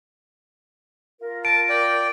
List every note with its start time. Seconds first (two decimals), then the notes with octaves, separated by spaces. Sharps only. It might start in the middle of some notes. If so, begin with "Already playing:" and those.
1.21 F4 A#4
1.45 A5 D7
1.69 D5 G5